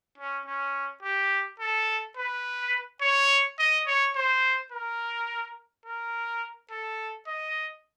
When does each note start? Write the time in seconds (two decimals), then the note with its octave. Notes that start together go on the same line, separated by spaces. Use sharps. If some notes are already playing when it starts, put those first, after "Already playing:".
0.18 C#4
0.46 C#4
1.03 G4
1.60 A4
2.17 B4
3.01 C#5
3.59 D#5
3.87 C#5
4.16 C5
4.72 A#4
5.86 A#4
6.71 A4
7.27 D#5